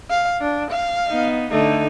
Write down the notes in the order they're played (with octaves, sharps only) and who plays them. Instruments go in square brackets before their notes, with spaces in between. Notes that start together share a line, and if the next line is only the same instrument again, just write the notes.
[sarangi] F5
D4
F5
[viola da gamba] B3 D#4
[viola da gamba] D3 D#4 [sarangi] A3